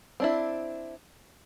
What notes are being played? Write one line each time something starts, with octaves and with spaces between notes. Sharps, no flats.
C4 D4 E4